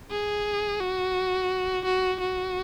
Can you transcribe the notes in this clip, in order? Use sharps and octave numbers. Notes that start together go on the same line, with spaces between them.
G#4
F#4
F#4
F#4